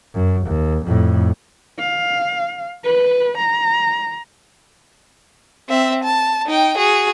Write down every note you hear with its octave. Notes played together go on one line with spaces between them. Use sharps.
F#2
D#2
F2 A2
F5
B4
A#5
C4 E5
A5
D#4 G5
F#4 G#4